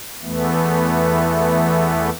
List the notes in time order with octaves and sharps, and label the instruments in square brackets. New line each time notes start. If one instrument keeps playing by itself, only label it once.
[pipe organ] E2 E3 A3 B3